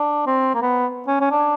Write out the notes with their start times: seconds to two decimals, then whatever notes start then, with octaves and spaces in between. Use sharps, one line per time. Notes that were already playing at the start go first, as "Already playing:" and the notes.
Already playing: D4
0.27 C4
0.55 A#3
0.62 B3
1.07 C#4
1.21 C#4
1.31 D4